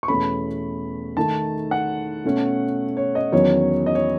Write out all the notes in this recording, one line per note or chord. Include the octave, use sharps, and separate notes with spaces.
C#6
E2 B2 A3 C#4 B5
D#3 A3 D#4 A5
F#5
B2 A3 C#4
C#5
D#5
E2 D#3 F#3 C#4 C#5
D#5
C#5